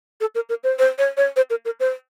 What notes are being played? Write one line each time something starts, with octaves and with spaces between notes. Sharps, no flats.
A4
A#4
A#4
C5
C5
C#5
C#5
C5
A#4
A#4
C5